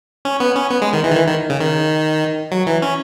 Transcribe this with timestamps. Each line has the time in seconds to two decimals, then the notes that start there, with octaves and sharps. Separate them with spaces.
0.25 C#4
0.40 B3
0.56 C#4
0.70 B3
0.82 G#3
0.93 D#3
1.04 E3
1.11 D#3
1.15 E3
1.27 D#3
1.50 C#3
1.61 D#3
2.52 F#3
2.66 E3
2.82 C#4